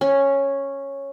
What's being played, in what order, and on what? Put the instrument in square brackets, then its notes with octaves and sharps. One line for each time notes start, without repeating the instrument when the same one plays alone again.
[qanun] C#4